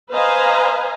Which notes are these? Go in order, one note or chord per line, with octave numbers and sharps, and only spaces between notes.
B4 C5 D#5 F5 G#5 A#5